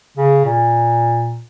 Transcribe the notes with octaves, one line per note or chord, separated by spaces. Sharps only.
C#3
A#2